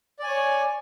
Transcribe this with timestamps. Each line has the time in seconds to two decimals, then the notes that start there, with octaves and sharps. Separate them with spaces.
0.19 D5
0.23 G#5
0.27 C#5